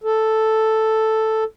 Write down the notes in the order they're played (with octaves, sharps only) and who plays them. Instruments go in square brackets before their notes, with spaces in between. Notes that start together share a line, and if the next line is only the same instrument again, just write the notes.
[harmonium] A4